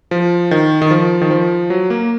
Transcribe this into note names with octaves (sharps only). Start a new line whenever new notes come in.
F3
D#3
D#3
F3
D#3
F3
F#3
A#3